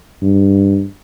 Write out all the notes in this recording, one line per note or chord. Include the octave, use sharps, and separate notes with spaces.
G2